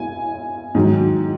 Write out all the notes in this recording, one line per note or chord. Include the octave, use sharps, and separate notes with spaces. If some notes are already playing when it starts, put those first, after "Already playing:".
Already playing: G#5
G#2 D#3 F#3